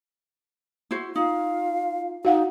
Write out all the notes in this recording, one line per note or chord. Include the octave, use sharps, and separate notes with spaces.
E4 F#4 C5
D#4 F4 F5
D#4 F#4 F5 F#5